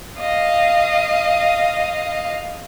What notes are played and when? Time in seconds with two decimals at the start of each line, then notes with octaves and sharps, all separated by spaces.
0.19 D#5 F5